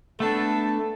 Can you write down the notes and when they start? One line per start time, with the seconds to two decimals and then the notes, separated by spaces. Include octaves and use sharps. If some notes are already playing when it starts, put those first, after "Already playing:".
0.20 A3 B3 D4 A4